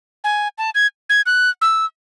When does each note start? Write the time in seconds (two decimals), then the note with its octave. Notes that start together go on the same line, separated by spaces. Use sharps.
0.24 G#5
0.58 A5
0.75 G#6
1.10 G#6
1.26 F#6
1.62 E6